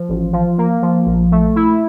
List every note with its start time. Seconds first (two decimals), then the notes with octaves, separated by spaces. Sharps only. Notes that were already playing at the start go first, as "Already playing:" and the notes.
Already playing: F3
0.09 A1
0.33 F3
0.58 A#3
0.82 F3
1.06 A#1
1.32 A3
1.56 E4